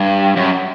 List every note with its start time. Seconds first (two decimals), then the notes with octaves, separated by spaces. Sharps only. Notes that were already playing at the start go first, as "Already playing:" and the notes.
Already playing: G2
0.37 F#2